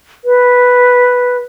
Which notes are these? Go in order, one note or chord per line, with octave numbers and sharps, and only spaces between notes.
B4